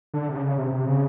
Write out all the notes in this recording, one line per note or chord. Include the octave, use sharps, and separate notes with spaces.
D3
C3
C#3
C3
C3
C#3